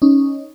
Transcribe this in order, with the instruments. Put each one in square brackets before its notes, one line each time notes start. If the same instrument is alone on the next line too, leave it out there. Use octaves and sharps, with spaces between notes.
[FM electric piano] C#4 D#4